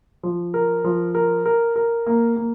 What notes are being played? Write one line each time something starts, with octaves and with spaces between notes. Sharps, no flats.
F3
A#4
F3
A#4
A#4
A#4
A#3
A#3